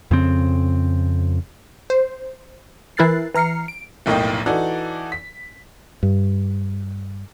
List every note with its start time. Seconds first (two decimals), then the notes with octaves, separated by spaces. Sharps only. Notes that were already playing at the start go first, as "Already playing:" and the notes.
0.11 F2 C#3 C4
1.90 C5
2.97 E3 E4 A#4 F#6 A6 C7
3.34 E3 A#5 F6 C7 C#7
3.68 D7
4.06 F1 B1 A2 A#3 D#5 G5
4.46 E3 D#4 F#4 A4 D5
5.12 B6
6.03 G2